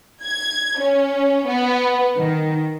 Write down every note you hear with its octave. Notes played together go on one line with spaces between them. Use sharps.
G#6
C#4
B3
D#3